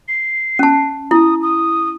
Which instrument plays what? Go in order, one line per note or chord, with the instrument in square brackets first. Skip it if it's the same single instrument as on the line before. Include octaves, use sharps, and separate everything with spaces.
[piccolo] C7
[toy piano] C#4 A5
[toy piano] E4 [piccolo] D#6
[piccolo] D#6